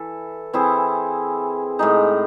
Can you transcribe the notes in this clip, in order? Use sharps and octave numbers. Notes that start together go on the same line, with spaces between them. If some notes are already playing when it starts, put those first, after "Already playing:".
Already playing: E3 A4
E3 C4 E4 G#4
A2 G#3 D#4